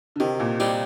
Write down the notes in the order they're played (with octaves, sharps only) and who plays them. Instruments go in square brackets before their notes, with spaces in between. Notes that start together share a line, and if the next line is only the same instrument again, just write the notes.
[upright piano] D3
[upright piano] C3 [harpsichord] D#3
[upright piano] A#2
[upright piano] C3 [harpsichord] G3 C4 D#4